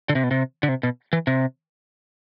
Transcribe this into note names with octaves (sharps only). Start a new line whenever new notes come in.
D3
C3
B2
C3
D3
C3
B2
E3
C3